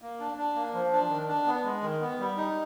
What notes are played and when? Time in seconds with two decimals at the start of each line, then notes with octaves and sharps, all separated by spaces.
0.02 A#3
0.20 D4
0.37 D4
0.55 A#3
0.74 F3
0.92 D4
1.09 D#3
1.28 D4
1.47 B3
1.64 G#3
1.83 D#3
2.01 B3
2.20 G3
2.37 D#4